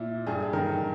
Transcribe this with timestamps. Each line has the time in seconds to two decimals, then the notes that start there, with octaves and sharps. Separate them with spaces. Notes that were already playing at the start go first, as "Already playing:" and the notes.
Already playing: A#2 E4
0.27 G2 G#4
0.53 D#3 A#4